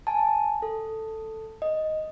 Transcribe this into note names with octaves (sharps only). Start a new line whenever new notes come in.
G#5 A5
A4
D#5